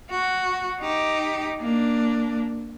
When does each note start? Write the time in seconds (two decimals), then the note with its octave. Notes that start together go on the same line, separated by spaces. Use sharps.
0.11 F#4
0.80 D#4 G4
1.60 A#3 D4